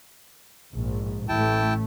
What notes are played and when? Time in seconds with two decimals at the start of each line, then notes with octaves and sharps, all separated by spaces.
0.72 A#1 G#2
1.29 A1 A3 E4 G5 A5